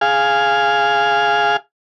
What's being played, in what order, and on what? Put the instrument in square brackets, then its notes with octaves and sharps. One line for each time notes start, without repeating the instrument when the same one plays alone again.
[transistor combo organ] G#4 F5